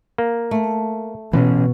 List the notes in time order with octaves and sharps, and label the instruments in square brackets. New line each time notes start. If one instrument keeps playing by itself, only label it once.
[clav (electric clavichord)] A#3
[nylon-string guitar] A3
[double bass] B2 [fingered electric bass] E3 C4 C#4